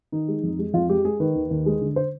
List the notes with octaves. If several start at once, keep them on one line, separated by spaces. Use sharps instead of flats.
D#3 D#4
G#3
F2
G#3
F2 F4
G#3 G4
G#3 G#4
D#3 B4
D#2
D#2
G#3
D3
C5